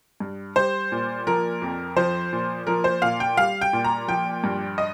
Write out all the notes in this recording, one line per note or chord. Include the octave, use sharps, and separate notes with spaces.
G2
G3 C5
A#2
F3 A#4
F2
F3 C5
A#2
F3 A#4
C5
A#2 F5
G5
G3 F5
G5
A#2
A#5
F3 G5
G2
D#5